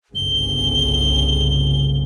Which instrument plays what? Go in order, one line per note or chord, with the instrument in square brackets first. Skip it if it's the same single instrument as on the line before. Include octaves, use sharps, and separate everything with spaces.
[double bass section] G1 C2 C#3 [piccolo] G7